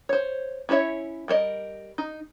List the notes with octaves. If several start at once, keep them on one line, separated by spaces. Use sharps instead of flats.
C5 C#5
C#4 E4 C5 C#5 E5
G3 A#4 C5 D#5
D#4